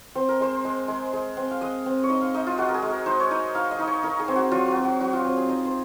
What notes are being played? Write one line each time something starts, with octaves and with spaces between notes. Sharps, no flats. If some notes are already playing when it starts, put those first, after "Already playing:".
C4 C5
A#4
G#3 C5
G#3
G#3
G#3
C4
F5
G#3 D#5
C4
C#5
D#4 D#5
F5
D#4 D#5
F4
G#3 F#4
A#4
G#4
G#3
A#4
D#4 C5
C#5
D#4 D#5
D#4 F5
D#5
D#4
C#5
D#4 A#4
G#4
C4
F#4
F#3 F4
F#4
C4
F#4
F#3 F#4
F4
C4
G#4
D#4 D#5
C5